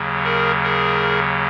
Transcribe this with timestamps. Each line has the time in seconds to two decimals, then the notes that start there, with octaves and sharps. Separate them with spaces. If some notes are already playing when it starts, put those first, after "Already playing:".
Already playing: D#2 C#3 F#3
0.24 G#4 A#4
0.63 G#4 A#4